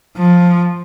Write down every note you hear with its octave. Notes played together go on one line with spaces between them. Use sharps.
F3